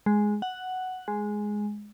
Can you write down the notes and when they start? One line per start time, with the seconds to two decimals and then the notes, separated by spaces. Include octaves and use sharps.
0.06 G#3
0.42 F#5
1.08 G#3